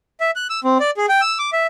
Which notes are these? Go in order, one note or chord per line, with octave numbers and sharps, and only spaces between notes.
E5
F#6
E6
C4
D5
G#4
G5
E6
D6
E5